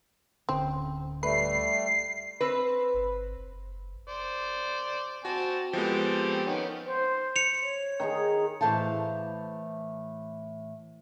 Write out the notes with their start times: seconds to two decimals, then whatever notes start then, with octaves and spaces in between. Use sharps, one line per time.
0.49 D1 D3 C4 C#4
1.23 G3 A3 B4 C7
2.41 C4 B4
2.94 G1
3.37 F#1
4.08 C5 D5
5.25 C4 F#4 G#5 A5
5.73 F3 G#3 B3 C4 G4 A4
6.47 D#3 B3 C#4
6.86 C5
7.36 C#7 F7
7.63 C#5
8.00 D#3 D#4 G#4
8.61 A2 E3 C#4 C5 F5 A5